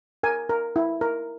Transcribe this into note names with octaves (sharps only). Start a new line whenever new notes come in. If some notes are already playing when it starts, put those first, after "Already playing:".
A#4 G#5
A#4
E4
A#4